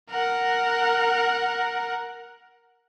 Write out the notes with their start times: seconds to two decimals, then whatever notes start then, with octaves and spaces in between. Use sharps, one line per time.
0.10 A#4 F#5